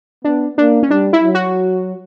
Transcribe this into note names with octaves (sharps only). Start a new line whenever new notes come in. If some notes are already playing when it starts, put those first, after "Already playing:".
B3 D4
A#3 D4
C#4
G3 D4
E4
F#3
F#4